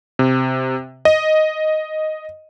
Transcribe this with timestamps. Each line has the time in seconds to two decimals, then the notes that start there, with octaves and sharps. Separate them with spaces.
0.19 C3
1.05 D#5